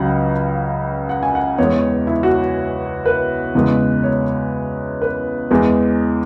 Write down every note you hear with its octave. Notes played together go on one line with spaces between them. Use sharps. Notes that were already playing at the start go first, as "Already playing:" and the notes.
Already playing: C#2 C#3 F#3 F#5
F#5
G#5
F#5
E2 E3 G#3 C#5
E4
F#4
B4
E2 C#3 E3 G#3
C#5
B4
E2 E3 G#3 G#4